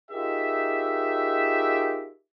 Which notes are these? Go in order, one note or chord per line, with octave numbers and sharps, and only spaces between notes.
D#4 F4 G4 G#4 A#4 E5